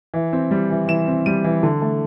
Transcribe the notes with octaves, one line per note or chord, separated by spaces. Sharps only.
E3
C4
G3
E3
E3 E7
C4
G3 D#7
E3
D3
A3